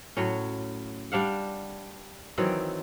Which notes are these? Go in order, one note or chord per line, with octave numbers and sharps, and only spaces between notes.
A2 F#3 C#4
G3 D4 F5 F#5
D#3 E3 F#3 C4